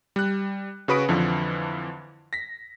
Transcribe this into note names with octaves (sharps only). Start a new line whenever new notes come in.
G3 F#6
C#3 F#4 B4 B5 D#6 D7
F2 D3 E3 F3
A#6 B6